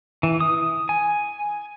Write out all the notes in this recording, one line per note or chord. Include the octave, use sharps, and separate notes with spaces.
E3
D#6
G#5